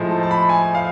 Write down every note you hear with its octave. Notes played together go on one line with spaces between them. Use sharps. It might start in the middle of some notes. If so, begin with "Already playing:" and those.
Already playing: A2 F3 G#3
A5
A5
B5
G#5
F5